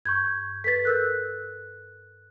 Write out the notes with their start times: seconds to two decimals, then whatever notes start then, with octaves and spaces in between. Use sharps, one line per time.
0.05 G2 C#6 G6 G#6
0.64 A4 B4 A6 B6
0.85 A#4 E6 F#6 G6